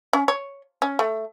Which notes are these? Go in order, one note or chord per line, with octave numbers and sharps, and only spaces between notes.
C#4
C#5
C#4
A3